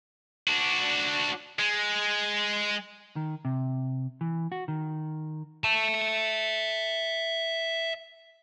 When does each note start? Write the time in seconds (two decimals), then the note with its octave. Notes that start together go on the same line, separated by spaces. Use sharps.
0.47 D4 F#4
1.60 G#3
3.16 D#3
3.45 C3
4.21 E3
4.52 F#4
4.68 D#3
5.64 E5 A5